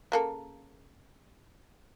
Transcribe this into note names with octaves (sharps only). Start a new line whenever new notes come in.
C#3 A#3 A4